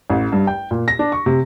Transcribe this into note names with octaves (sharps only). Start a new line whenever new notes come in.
A1
G2
G5
A#2
A#6
D4
C#6
C3